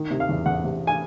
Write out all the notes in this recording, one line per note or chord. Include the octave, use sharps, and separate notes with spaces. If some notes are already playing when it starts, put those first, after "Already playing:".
Already playing: D#3
C3
F5
E2
E2 F#5
C3
G#5